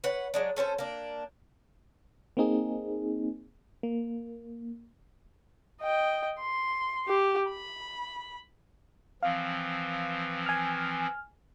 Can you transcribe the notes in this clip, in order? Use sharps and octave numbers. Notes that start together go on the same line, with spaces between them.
B4 C#5 F#5
F#3 G#3 D4
A3 C#4 A4 C5
A#3 D4
A#3 C4 D#4 G#4
A#3
D#5 G5
C6
G4
B5
E3 F3 C4 F5
G#5 F6